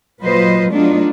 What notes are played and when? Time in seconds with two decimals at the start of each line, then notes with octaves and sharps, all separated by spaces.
0.20 A#2 F#3 F4 B4 C5 D#5
0.71 F#3 A3 B3 D4 D#4 F4